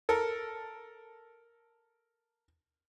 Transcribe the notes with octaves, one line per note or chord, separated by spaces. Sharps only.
A4 A#4